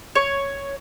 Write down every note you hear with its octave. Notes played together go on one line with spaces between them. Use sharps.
C#5